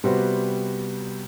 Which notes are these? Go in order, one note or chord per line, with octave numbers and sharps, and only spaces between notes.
C3 G3 B3 F#4 C5